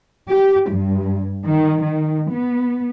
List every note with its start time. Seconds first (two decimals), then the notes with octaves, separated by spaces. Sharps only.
0.28 G4
0.69 G2
1.45 D#3
1.83 D#3
2.31 B3